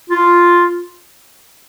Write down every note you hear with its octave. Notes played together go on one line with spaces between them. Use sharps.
F4